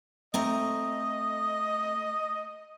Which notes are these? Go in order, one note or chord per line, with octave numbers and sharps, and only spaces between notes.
A3 C4 D#5 A#5